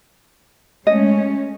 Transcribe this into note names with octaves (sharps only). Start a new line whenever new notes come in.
G#3 A3 C#4 D#5